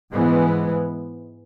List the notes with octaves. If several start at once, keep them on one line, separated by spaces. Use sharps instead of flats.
G#2 E3 G#3 B3